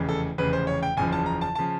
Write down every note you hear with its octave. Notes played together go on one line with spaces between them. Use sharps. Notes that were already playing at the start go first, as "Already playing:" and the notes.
Already playing: F1 E2 C#3
A4
F1 E2 C#3 B4
C5
C#5
G5
F#1 E2 C#3 F3 G#5
A5
A#5
A5
C#3 F3 A5